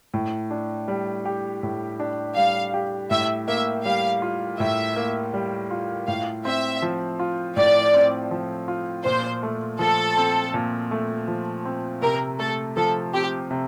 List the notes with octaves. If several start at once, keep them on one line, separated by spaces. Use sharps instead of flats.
A2
D4
G3
G4
A2
D4
G3 F5
G4
A2 E5
A#3 E5
G3 F5
F4
A2 E5
A#3
G3
F4
A2 F5
C4 E5
F3
F4
A2 D5
C4
F3
F4
A#2 C5
A3
F3 A4
C4
A#2
A3
F3
C4
C3 A#4
A3 A4
F3 A4
C4 G4
C3